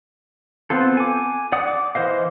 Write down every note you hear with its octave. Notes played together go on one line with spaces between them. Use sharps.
B3 C4 F4 A4
G#5 D6
D5 F#5 D#6
D6
E3 A#4 C5 D#5 F5